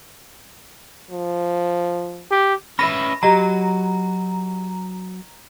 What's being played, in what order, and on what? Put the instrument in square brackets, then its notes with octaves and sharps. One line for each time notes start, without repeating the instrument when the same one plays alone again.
[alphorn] F3
[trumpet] G4
[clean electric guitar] C#4 B4 E5 [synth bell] B5 A#6
[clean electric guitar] F#3 [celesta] G4 D#5 B5 [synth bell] A#5